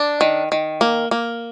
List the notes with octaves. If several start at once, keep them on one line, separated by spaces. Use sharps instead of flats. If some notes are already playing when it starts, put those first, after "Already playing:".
Already playing: D4
D#3
D#3
A#3
A#3